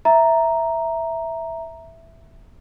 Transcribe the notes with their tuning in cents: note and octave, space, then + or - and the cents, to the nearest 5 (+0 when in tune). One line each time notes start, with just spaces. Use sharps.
E5 +0 A#5 +0